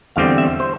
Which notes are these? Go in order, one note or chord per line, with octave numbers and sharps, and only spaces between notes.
E2 D3 G3 C4 F5
E5
C5